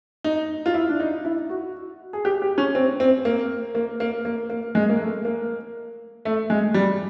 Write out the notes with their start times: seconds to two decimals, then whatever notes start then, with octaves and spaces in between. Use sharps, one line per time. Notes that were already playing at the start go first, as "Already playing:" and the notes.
0.24 D#4
0.66 F4
0.74 E4
0.89 D4
1.00 D#4
1.25 E4
1.49 F#4
2.13 G#4
2.25 G4
2.42 G4
2.58 C#4
2.75 C4
3.00 C4
3.25 A#3
3.75 A#3
4.00 A#3
4.25 A#3
4.50 A#3
4.75 G#3
4.90 A#3
5.00 A3
5.25 A#3
6.25 A3
6.50 G#3
6.74 G3